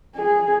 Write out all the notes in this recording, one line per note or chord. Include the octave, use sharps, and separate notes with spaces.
G#4